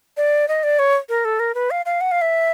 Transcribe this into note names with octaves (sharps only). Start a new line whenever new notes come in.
D5
D#5
D5
C#5
A#4
A4
A#4
B4
F5
F5
F#5
F5
E5